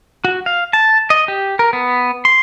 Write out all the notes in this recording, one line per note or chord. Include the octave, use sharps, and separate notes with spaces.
F#4
F5
A5
D#5
G4
A#4
B3
C6